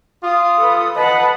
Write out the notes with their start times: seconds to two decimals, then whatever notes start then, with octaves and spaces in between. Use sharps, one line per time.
0.23 F4 D#6
0.57 A4 B4
0.96 B4 D#5 F#5 A5